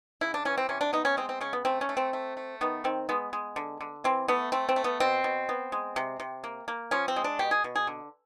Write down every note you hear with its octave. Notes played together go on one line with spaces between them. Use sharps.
C#3 E4
D4
E3 C#4
C4
C3 C#4
D4
B3 D#4
C#4
G#3 C4
C4
C#3 C#4
B3
A3 C4
C#4
A3
C4
A3
A3
D#3 B3
D#3 C4
G#3 B3
G#3
D3
D3
E3 C4
A3 B3
A3 C4
C4
A3
B3
B2 C4
B2
B3
G#3
C3
C3
A#3
A#3
F3 C#4
C4
G#3
D4
B2 G4
G#4
B2
G#4
D3